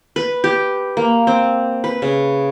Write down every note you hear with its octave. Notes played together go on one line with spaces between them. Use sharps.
B4
G4
A#3
C4
B4
C#3